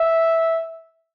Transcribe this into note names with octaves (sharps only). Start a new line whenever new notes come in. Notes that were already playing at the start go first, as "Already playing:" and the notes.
Already playing: E5